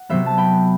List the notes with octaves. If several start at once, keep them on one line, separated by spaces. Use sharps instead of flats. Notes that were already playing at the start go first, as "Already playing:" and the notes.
Already playing: F#5
C3 F#3 B3 C5 E5
A5
G5 B5